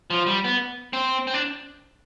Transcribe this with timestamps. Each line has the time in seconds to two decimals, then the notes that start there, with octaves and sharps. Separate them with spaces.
0.10 F3
0.26 G3
0.44 B3
0.93 C4
1.27 C4
1.34 D4